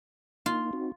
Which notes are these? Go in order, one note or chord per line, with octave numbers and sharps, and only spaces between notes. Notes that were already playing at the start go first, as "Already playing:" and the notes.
A#3 D#4 F4
C4 D#4 F#4